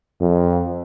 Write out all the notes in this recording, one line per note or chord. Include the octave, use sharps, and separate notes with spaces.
F2